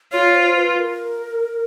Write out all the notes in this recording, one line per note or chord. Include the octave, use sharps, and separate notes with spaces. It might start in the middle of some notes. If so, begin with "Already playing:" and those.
F4 C#5
C5
B4
A#4